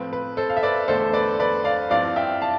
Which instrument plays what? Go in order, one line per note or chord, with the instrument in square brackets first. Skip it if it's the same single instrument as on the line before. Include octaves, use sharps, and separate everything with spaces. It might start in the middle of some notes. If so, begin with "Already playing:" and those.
Already playing: [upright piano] A2 F3 C4 B4
B4
A4 C5
F5
E5
B4 D5
E2 D3 A3 A4 C5
B4 D5
B4 D5
D5 F5
G2 F3 C4 E4 D5 F5
E5 G5
F5 A5